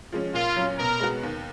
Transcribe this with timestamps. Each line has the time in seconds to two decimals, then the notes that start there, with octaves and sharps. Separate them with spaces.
0.12 F3 G#3 C#4
0.34 A#2 F4
0.56 F#3 C#4
0.78 B2 A#4
1.00 G#3 B3 F#4
1.23 D#2